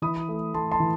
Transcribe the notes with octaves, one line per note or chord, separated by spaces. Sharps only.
E3 B5 D#6
A3
A3 A5 C6
A5 C6
E3